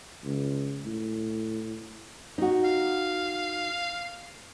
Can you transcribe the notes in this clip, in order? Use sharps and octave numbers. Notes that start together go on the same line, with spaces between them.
C#2
A2
D#4 F#4
F5